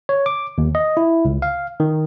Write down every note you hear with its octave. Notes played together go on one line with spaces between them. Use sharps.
C#5
D6
D#2
D#5
E4
C#2
F5
D#3